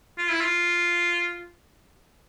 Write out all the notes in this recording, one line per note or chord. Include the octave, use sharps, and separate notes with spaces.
F4
E4
F4